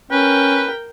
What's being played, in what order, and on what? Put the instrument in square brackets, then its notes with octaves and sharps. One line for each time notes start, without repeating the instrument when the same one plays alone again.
[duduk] C#4 [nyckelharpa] A#4 G5 [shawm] B4